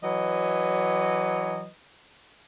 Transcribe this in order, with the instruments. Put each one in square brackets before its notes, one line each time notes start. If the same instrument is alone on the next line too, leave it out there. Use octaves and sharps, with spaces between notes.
[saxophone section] E3 F#3 B4 D#5